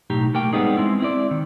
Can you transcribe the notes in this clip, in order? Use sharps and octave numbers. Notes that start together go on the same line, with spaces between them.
B1 A2 D#4 G4
A3 A#3 G4 G5
G3 G#3 B3 C4 D#4 G#4
G#3 C4 E4
C4 E4 D5
D#3